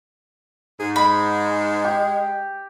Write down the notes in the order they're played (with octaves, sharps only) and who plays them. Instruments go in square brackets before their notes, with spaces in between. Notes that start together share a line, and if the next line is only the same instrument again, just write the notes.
[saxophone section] G#2 [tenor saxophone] G#4
[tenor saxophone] G#3 [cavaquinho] B5
[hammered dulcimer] G4